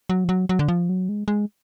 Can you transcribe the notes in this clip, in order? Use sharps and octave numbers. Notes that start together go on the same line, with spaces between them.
F#3
F3
F#3
F#3
D3
F3
F#3
G#3
G#3